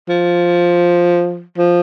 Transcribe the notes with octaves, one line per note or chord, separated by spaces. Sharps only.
F3
F3